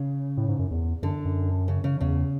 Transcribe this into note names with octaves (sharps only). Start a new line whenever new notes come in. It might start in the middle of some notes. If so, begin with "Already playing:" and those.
Already playing: C#3
A2
G#2
F#2
E2
F#2 D3
F#2
C#3
C#3
E2 C#3